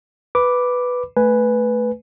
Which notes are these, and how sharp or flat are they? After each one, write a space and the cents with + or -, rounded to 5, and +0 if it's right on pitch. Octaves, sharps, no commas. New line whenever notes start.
B4 +0 B5 +0 D6 +0
A3 +0 B4 +0 G#5 +0